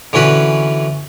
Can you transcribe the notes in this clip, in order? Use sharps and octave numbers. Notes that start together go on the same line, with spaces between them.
D3 E3 C#4 F#4 B4